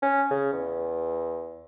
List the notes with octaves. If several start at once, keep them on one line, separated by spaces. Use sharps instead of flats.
C#4
C#3
E2